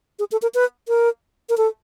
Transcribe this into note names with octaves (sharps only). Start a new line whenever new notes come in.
G#4
A4
A#4
B4
A#4
A#4
A4